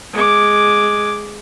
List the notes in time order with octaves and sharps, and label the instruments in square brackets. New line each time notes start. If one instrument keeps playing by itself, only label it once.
[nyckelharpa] G#3 D6